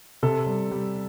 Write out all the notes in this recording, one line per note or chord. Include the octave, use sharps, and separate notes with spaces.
C3 A4
G3
G3